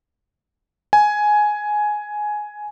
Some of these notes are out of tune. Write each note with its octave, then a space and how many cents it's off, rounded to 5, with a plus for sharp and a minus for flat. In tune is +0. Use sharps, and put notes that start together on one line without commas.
G#5 +10